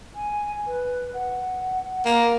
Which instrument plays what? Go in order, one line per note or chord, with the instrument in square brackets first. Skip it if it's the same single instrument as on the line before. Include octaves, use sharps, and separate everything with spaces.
[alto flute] G#5
B4
F#5
[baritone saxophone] A#3